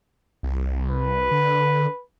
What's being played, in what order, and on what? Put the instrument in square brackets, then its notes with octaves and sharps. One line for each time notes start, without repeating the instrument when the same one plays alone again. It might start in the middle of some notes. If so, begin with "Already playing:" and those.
[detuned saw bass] C2
[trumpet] B4
[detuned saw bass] D3